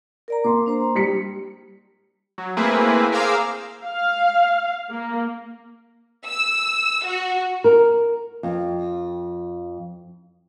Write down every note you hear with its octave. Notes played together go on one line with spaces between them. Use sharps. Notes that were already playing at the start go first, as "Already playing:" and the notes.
A#4 D5 A#5
A#3 C6 D6
D4 C5 A#5
G3 B6 C#7
F#3
A3 A#3 C4 E4 G#4 B4
G#4 A#4 C5 F5 D6 E6
F5
A#3
E6
F#4
A#4
F2